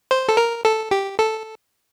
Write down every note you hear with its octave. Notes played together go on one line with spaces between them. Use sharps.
C5
A4
A#4
A4
G4
A4